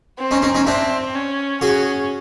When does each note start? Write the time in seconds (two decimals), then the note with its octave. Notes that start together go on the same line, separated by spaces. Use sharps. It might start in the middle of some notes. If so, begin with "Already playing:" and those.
0.19 C4
0.31 C#4 D#4
0.42 C#4 D#4
0.55 C#4 D#4
0.66 C4 D4 E4
1.15 C#4
1.61 C#4 F#4 G#4